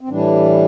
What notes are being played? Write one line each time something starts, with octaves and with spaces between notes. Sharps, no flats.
C4
A2 E3 G3 D4